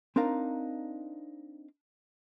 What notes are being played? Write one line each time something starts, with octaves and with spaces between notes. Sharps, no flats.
C4 D4 D#4 A#4 F5